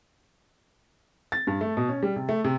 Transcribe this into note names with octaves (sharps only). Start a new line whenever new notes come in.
A6
G2
A3
B2
C#4
G3
C3
A3
C3